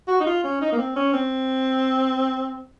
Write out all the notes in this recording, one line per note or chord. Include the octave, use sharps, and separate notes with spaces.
F#4
D#4
F4
C#4
D#4
A#3
C4
C#4
C4